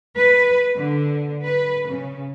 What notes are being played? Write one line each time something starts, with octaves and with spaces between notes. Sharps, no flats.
B4
D3
B4
C#3